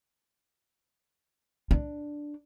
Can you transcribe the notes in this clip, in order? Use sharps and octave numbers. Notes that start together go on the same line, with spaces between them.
D4